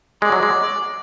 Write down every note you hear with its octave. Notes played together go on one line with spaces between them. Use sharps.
G#3 D5
F#3
G#3